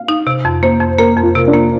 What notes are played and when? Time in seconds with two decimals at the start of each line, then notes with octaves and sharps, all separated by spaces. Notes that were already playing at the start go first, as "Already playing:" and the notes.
Already playing: F5
0.08 D#4
0.27 C3
0.45 F2
0.63 A#3 C5
0.80 F2
0.98 A#3 A#4
1.17 F2
1.23 F4
1.35 C3
1.47 D4
1.54 A#3